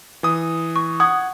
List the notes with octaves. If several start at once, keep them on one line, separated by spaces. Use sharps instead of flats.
E3 D#6
C#6
F#5 D#6 G#6